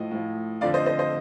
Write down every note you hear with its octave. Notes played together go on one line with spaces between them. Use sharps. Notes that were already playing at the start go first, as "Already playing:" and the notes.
Already playing: A2 F3 D#5
A2 F3
F2 D3 F3 D5 F5
C5 D#5
C5 D#5
C5 D#5